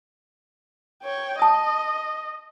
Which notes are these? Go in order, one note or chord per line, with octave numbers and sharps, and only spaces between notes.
C#5 G5
D#5 A5 D#6